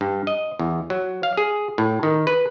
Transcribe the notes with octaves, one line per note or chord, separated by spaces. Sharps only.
G2
D#5
E2
F#3
F5
G#4
A2
D#3
B4